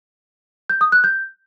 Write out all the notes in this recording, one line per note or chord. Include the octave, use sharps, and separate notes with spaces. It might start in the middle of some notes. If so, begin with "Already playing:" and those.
G6
D#6
F#6
G6